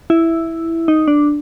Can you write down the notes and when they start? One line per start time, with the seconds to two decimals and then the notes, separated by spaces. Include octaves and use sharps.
0.10 E4
0.88 D#4
1.08 D4